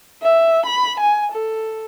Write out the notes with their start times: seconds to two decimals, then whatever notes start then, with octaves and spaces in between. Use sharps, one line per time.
0.22 E5
0.66 B5
1.00 G#5
1.33 A4